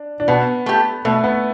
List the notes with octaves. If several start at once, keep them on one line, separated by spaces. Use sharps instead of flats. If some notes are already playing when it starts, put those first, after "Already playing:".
Already playing: D4
D4
B2 B3
A3 G4
B2 A3
B3